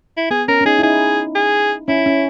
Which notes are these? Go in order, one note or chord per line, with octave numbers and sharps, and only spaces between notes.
E4
B3 G#4
C#4 A#4
C#4
D#4 G#4
E4
D#4 G#4
G#4
C#4 E4
C#4